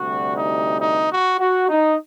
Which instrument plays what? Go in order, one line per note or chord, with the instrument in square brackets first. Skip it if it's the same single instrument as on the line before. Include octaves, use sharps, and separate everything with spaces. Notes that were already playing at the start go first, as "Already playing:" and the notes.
Already playing: [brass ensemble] D2 C3 G3 F#4
D#4
D#4
F#4
F#4
D#4